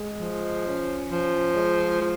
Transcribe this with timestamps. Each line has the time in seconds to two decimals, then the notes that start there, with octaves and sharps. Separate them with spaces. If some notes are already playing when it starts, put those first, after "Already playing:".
Already playing: G#3
0.18 F3
0.64 C#4
1.08 F3
1.54 G#3
1.99 F3